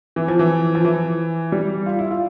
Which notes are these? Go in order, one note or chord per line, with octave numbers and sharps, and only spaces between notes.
E3
F3
E3
F3
E3
G3
F4
E4
F4